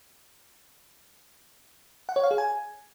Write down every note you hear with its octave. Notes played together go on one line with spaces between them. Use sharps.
F#5
C#5
F5
G#4
G#5